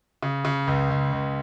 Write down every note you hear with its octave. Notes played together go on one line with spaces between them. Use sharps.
C#3
C#3
C#2
C#2
C#2